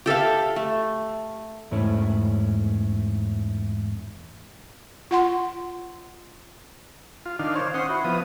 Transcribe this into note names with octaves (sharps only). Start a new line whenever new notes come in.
G4 A4 E5 F5
A3
E2 G#2 A3 C#4 E4 C#5
F4 F#5 C6
F4
D#3 D4 F5
C5 C#5
C#4 C5 F#5 C6 D#6
E4 F#4
F3 B3 D#6